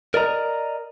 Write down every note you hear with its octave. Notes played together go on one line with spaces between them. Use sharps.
A#4 D5 D#5 A#5